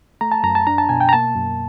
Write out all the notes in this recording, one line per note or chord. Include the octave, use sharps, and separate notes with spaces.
A3 A#5
A5
F#2 A#5
A5
D4 A#5
A5
B2 G#5
G5
A#5
A#3 A5
F#2